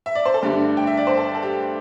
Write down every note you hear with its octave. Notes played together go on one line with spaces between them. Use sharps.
E5
D5
C5
A4
G2 D3 A3 D4 G4
G5
E5
D5
C5
A4
A4
G4